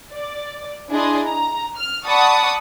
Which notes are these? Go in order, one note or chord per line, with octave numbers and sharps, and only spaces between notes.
D5
D4 E4 G#4 D#5 C6
A#5
F6
D5 F#5 A5 B5 C#6 D#6